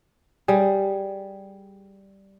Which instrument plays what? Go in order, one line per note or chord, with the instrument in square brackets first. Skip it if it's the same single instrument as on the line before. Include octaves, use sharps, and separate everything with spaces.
[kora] G3 G#4